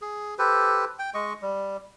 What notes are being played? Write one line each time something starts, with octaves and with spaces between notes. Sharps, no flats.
G#4
G4 A4 B4 C5
G5
G#3 D#5 C#6
G3